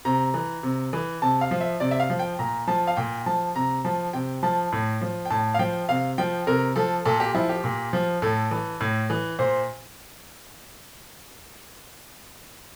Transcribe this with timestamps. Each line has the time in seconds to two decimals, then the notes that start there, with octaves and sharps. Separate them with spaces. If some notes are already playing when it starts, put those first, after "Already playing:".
0.05 C3 A#5
0.34 E3
0.63 C3
0.93 E3
1.22 C3 A5
1.41 F5
1.51 F3
1.61 E5
1.80 C3 D5
1.91 E5
2.00 F5
2.10 F3
2.19 G5
2.39 A#2 A#5
2.67 F3 A5
2.87 F5
2.97 A#2 G5
3.26 F3 A5
3.55 C3 A#5
3.85 F3 A5
4.13 C3 G5
4.43 F3 A5
4.72 A2
5.02 F3
5.25 G5
5.30 A2 A5
5.54 F5
5.59 F3 G5
5.89 C3 F5
6.18 F3 G5
6.47 C3 A#4
6.76 F3 A4
7.05 A#2 A4
7.20 G4
7.34 F3 E4
7.49 G4
7.64 A#2
7.93 F3
8.22 A2 A4
8.51 E3
8.81 A2
9.10 E3
9.39 A#2 C5